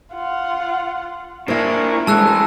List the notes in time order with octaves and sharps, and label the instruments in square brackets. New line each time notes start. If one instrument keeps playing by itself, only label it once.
[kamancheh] F4 F#5
[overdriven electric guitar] A#3 D4 [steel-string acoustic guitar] E4 C5 [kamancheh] C#6
[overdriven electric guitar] E3 A4 [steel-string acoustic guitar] G#3 [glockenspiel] A5 E6 F#6